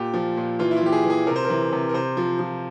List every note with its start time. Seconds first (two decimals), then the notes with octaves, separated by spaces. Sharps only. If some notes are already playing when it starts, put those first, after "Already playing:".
Already playing: A#2 G4
0.14 F3
0.37 A#2
0.59 E3 F4
0.71 E4
0.77 F4
0.82 E3 G4
0.92 G#4
1.04 E3
1.10 G#4
1.27 C3 A#4
1.36 C5
1.45 A#4
1.50 E3
1.73 C3
1.89 A#4
1.94 C3 C5
2.17 F3
2.39 F3